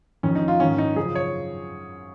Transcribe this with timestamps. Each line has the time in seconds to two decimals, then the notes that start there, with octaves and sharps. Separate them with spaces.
0.23 F2 D#3 C#4
0.35 D#4
0.48 F4
0.59 G#2 D#3 C#4
0.78 D#4
0.96 F#2 C#3 F3 G#4
1.15 C#5